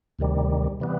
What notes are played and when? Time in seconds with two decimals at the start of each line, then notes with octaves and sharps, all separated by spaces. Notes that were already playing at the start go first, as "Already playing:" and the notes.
0.19 D2 C3 D#3 G3
0.80 C3 E3 G3 B3